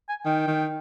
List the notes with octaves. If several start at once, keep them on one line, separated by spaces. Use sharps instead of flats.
G#5
D#3 G5
D#3